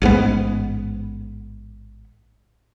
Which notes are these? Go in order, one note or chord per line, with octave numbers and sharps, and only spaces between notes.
A1 G#2 C3 B3